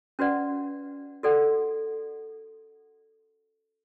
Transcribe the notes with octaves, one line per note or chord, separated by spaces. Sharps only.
C#4 F#4 B4 D5 F#5
F#4 A4 D5 F#5